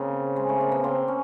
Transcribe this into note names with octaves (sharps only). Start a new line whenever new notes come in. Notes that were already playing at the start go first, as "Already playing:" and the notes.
Already playing: C#3 A#3 C4
G#3
A3
A#3
B3
A#3 C4
C#4